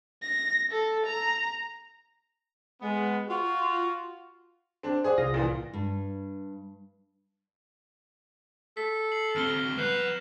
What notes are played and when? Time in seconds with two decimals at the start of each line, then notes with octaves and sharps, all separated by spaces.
0.22 A#6
0.72 A4
1.07 A#5
2.81 G#3 B3
3.28 F4 F#4
4.83 C4 D4
5.04 G#4 C5 D5 F#5
5.18 C2 F4 D#6 A#6
5.34 A#1 A#2 E3
5.73 G2
8.77 A4 B6
9.12 C7 F#7
9.36 D2 C4 F6 A#6 G7
9.78 F#3 B4 F#5 G6 C7 E7